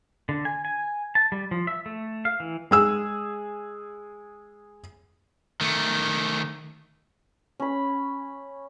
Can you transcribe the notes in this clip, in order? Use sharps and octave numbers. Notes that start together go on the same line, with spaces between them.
D3
G#5
G#5
A5
G3
F3
E5
A3
F5
E3
G#3 G#4 E6
D#3 A3
C#4 B5